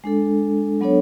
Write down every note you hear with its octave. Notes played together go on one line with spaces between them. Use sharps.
G#3 D4 A4
F#3 B3 D4 A4 C#5